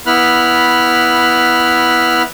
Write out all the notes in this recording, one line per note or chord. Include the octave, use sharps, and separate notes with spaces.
B3 E4 B5 F6 F#6